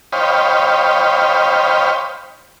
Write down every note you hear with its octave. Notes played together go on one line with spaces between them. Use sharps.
C5 C#5 D#5 F5 G5 B5